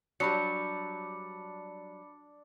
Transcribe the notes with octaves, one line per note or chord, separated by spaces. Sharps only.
F#3 G3 D4 B5 C#7